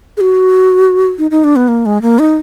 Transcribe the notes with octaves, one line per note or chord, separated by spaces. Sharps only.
G#4
F#4
D#4
D#4
D4
B3
A#3
G#3
A#3
D#4